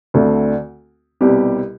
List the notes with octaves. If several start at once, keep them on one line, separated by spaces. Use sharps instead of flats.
D2 D3 A3 C4
C2 B2 G3 C4 G4